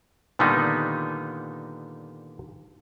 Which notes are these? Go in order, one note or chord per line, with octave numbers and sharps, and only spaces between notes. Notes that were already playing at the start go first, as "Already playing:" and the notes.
A#2 D3 D#3 G3 B3 D#4